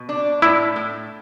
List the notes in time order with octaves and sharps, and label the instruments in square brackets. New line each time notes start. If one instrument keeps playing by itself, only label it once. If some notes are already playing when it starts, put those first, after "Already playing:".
Already playing: [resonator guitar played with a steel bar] B2
D4
[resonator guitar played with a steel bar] A2 [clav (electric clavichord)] E4
[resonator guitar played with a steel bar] A2